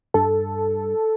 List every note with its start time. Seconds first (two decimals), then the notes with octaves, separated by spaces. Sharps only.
0.14 G2 A4